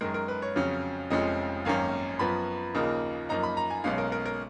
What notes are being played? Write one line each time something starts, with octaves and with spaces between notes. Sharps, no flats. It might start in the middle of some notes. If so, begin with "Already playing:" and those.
F#2 D#3 G#3 A#4
A#4
B4
C#5
F2 C#3 F#3 C#4
F1 F2 F3 G#3 C#4 D#5
G#1 F#2 D#3 A#3 C#4 F5
F#2 F3 B3 B5
D#2 C#3 F3 A#3 D#4
F#2 F3 A#3 D#4 A#5
B5
A#5
G#5
B1 B2 G#3 C#4 F5
A#4
A#4
A#4